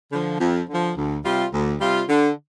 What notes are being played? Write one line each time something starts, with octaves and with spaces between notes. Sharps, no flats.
D3 F3
F2
D3 F3
D2
C3 G3 F4
D2
C3 G3 F4
D3